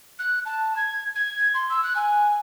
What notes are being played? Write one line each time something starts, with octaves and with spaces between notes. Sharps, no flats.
F#6
A5
G#6
G#6
C6
E6
F#6
G#5